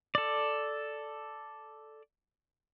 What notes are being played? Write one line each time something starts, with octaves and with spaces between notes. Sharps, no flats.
A4 D5